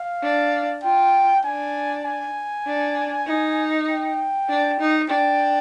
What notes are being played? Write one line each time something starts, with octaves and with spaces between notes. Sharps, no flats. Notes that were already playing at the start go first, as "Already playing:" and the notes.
Already playing: F5
D4
F4 G5
D4 G#5
G#5
D4
D#4
G5
D4
D#4
D4 G5